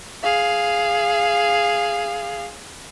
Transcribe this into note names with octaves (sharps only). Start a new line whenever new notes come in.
G#4 F5